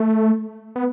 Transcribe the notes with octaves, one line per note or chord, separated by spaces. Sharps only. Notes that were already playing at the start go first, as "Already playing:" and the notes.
Already playing: A3
B3